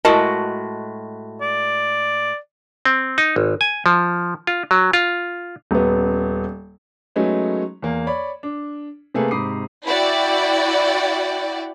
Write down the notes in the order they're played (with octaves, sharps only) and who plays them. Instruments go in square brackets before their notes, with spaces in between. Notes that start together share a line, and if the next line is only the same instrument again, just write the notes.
[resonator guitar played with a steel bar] A2 G#3 F#4 [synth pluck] A#4 D#5 A5
[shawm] D5
[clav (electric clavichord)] C4
D#4
G#1
G#5
F3
F4
F#3
F4
[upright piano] D#1 B3
[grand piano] F#3 G#3 A3 B3 C#4 D#4
E2 A#3
C#5 D5 B5
D4
C3 A3 A#3 G#4 A4 B4
G#2 C3 B5 D6 D#6 C7
[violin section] E4 F#4 D5 G5